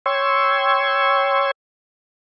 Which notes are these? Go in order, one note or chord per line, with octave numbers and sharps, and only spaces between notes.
C#5 G5 C6 C#6 E6 G#6